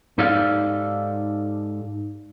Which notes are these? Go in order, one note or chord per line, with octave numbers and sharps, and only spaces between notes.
G#2 D#4 G4 A4 D5 F5